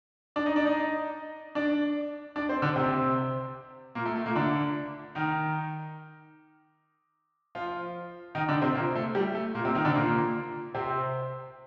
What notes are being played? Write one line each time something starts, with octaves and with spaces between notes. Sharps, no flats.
D4 D5
D#4 D#5
D4 D5
D#4 D#5
D4 D5
D4 D5
C4 C5
D3 D4
C3 C4
A#2 A#3
A3
A3
A#2 A#3
D3 D4
D#3 D#4
F3 F4
D#3 D#4
D3 D4
C3 C4
A#2 A#3
A3
G3
A3
A#2 A#3
C3 C4
D#3 D#4
D3 D4
A#2 A#3
C3 C4